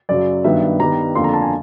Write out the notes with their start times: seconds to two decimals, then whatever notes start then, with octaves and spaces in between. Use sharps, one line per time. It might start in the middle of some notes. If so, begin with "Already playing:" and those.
0.09 F#2 C#3 F#3 D5
0.44 G2 D#3 F#3 B3 E5
0.80 G2 D#3 G3 B3 A#5
1.15 F2 D3 F3 A#3 C6
1.24 A#5
1.34 A5
1.42 G#5